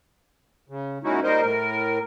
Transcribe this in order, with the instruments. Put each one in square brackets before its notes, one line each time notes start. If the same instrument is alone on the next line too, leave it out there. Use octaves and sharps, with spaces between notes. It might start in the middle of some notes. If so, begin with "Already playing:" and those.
[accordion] C#3
A#2 G#3 C#4 D#4 E4 F#4
A#2 G3 D#4 A#4 C5 D#5
A2 A#4